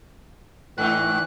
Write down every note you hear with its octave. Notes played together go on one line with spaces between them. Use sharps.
G#2 E3 A3 D#4 F#6